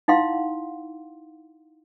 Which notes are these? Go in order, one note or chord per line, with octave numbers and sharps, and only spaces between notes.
D#4 E4 F5 F#5 C6